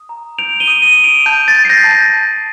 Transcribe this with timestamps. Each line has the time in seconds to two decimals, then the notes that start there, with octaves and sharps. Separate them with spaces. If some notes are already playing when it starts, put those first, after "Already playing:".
Already playing: D#6
0.09 A#5
0.38 G6 D7 F7
0.60 D#7 G7
0.68 D#6
0.82 D#7 G7
0.97 D#6
1.04 D7 F7
1.26 A5 G6
1.48 A6
1.55 G6
1.65 C7
1.69 G6 A#6
1.84 A5
1.91 G6 A#6
2.13 A5